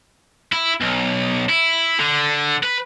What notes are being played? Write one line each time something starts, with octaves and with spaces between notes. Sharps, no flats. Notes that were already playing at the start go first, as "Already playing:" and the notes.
E4
B1
E4
D3
B4